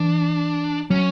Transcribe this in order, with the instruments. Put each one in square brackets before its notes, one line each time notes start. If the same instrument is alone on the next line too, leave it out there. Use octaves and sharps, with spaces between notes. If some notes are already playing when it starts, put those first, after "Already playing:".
Already playing: [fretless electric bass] E3 [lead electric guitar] D4
[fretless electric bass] F#3 [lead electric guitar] C#4